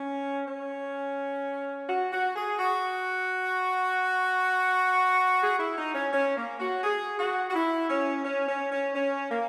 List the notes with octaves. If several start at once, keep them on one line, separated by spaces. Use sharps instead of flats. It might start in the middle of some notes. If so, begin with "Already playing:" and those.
Already playing: C#4
C#4
F#4
F#4
G#4
F#4
G#4
E4
D#4
C#4
C#4
A#3
F#4
G#4
F#4
F#4
E4
C#4
C#4
C#4
C#4
C#4
A#3